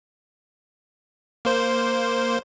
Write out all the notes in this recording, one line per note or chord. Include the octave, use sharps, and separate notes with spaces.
A#3 C5